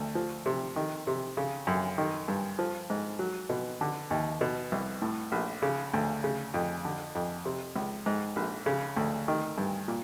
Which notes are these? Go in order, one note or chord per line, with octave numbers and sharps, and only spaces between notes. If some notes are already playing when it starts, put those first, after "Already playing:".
Already playing: D2
F3
C3
D#3
C3
C#3
F#2
D#3
G2
F3
G#2
F#3
B2
D3
D#2
B2
C2
A2
A#1
C#3
D2
C#3
F2
D3
F2
C3
C#2
G#2
A#1
C#3
D2
D#3
G2
A#2